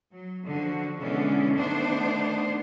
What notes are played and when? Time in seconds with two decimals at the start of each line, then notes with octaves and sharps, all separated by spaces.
0.11 F#3
0.47 D3 F3 F#4
0.99 B2 D3 E3 G#3 B3 C#4
1.54 D#3 A3 B3 D4 C5